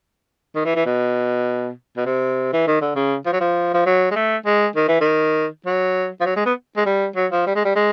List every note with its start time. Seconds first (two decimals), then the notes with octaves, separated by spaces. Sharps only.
0.55 D#3
0.65 E3
0.76 E3
0.86 B2
1.97 B2
2.06 C3
2.53 E3
2.67 D#3
2.81 D3
2.95 C#3
3.26 F3
3.33 F#3
3.40 F3
3.74 F3
3.86 F#3
4.11 G#3
4.16 A3
4.46 G#3
4.76 D#3
4.88 E3
5.01 D#3
5.66 F#3
6.21 F3
6.25 F#3
6.36 G#3
6.46 B3
6.77 G#3
6.86 G3
7.16 F#3
7.32 F3
7.46 G3
7.56 G#3
7.65 G3
7.76 G#3